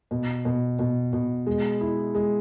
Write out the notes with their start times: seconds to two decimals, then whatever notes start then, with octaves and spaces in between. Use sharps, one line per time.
0.11 B2
0.45 B2
0.79 B2
1.13 B2
1.47 G#3
1.81 E4
2.15 G#3